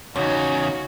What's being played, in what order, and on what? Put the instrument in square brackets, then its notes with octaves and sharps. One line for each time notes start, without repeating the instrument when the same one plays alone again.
[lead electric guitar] E2 C#3 [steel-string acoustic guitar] C#4 [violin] D#4 C#5 [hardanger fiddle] F#4